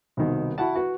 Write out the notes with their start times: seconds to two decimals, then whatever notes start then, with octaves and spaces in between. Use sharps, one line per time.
0.17 C2 B2 D#3
0.58 E4 F#4 F#5 A5
0.75 F#4 B4